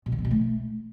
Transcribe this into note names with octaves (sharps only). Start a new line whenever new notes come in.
B2
D3
B3
B2
A3